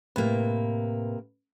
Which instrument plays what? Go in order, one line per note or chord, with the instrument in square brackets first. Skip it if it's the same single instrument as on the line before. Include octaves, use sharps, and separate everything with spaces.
[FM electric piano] A2 B4 [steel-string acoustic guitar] C3 A#3